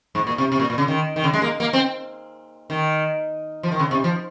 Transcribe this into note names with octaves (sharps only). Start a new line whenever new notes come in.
G#2
A#2
C3
C3
A#2
A#2
C#3
D#3
D#3
C#3
G#3
A#3
A#3
C4
D#3
F3
D#3
C#3
C3
F3